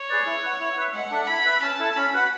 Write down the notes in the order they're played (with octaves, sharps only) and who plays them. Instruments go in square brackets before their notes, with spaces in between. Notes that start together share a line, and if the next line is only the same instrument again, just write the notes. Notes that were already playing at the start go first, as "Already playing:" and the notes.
Already playing: [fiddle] C#5
[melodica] G#4 B4 D5
E4
B4 F#5
E4
B4 E5
[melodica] G#3 [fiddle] F#5
[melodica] D4 A4 E5
[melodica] E4 [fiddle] B5
[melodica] B4 E5
[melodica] C#4 [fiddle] A5
[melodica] E4 A4
[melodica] C#4 [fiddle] B5
[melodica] F#4 B4 F#5